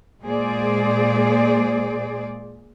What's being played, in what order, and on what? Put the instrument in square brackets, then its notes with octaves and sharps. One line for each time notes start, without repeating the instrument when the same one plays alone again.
[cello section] A#2 G#3 A#3 G#4 C5 D5